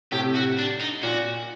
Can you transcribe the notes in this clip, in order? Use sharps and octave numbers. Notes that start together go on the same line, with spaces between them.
A2 C3 G4
F#4
D4
D#4
A#2 F#4